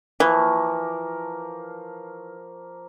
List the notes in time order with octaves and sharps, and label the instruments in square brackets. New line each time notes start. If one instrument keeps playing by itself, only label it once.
[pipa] E3 [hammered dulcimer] F3 A#3 C#6